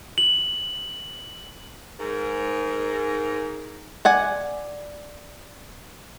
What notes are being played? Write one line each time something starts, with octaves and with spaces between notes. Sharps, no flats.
F#7
G#2 A#4
D5 F#5 G#5